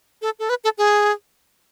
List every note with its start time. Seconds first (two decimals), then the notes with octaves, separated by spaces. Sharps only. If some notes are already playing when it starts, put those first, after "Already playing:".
0.22 A4
0.39 A4
0.49 B4
0.64 A4
0.78 G#4